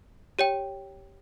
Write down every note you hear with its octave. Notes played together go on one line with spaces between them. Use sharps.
G4 C#5 G5